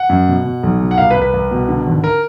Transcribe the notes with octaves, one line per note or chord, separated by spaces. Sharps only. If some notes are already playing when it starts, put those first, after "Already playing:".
Already playing: F#5
F#2
B2
B2
B1
B2
F#5
C2 F5
B4
C2
B4
C2
B2
D3
G#1
A#4